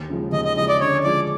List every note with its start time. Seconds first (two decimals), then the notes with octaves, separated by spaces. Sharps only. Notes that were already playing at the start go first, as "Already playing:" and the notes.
Already playing: D#2
0.10 C#3 F3 G#3
0.32 D#2 D#5
0.45 D#5
0.57 C#3 F3 G#3 D#5
0.69 D5
0.81 D3 C#5
1.04 F3 G#3 C#4 D5